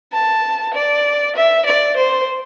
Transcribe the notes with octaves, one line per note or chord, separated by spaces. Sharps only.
A5
D5
E5
D5
C5